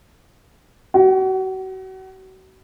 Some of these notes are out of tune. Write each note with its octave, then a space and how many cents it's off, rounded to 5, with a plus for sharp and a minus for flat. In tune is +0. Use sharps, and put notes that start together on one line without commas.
F#4 +35